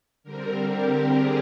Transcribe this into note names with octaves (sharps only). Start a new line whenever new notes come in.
D3 G3 C4 A#4
G4
G#4